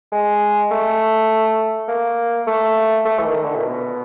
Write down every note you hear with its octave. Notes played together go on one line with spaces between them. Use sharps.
G#3
A3
A#3
A3
A3
E3
D#3
D3
A#2
B2